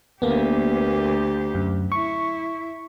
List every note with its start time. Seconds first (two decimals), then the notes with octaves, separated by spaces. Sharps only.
0.22 D2 A#3 B3 G4
1.55 F#2
1.92 E4 C#6